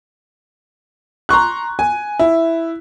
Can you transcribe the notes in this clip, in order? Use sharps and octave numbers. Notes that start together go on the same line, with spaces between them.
A#5 C6 C#6 F#6
G#5
E4